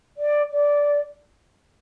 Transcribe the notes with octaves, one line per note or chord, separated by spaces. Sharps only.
D5
D5